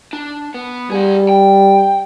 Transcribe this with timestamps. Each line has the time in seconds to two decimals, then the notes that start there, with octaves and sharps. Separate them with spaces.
0.13 D4
0.54 B3
0.91 G3 G#4 F#5
1.29 G5